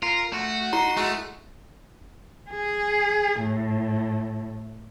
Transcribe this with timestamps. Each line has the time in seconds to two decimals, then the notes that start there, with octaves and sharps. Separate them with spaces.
0.03 F4 A#4
0.33 A3 F#4
0.73 D#4 E4 A#5 C6
0.97 G#3 A3 F#4
2.50 G#4
3.42 A2